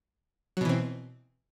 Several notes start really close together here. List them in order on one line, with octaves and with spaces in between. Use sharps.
F#3 B2 E3 C4